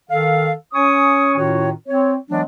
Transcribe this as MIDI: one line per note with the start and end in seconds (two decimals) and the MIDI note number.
0.10 0.52 51
0.10 0.52 69
0.10 0.52 77
0.73 1.33 61
0.73 1.33 73
0.73 1.33 80
0.73 1.33 85
0.73 1.33 87
1.36 1.70 45
1.36 1.70 51
1.36 1.70 61
1.36 1.70 65
1.36 1.70 66
1.36 1.70 73
1.87 2.14 60
1.87 2.14 73
2.30 2.42 52
2.30 2.42 54
2.30 2.42 56
2.30 2.42 59
2.30 2.42 62